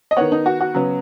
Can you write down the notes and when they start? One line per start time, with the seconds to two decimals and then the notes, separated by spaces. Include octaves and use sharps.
0.11 D#5
0.17 D#3 B3 C#5 F#5
0.32 D#4
0.46 F#4
0.61 F#4
0.74 C#3 F#3 B3